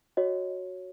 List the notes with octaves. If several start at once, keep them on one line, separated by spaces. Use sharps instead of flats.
F#4 C#5 D#5